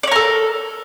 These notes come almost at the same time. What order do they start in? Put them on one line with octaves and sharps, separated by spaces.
D5 C#5 A#4 A4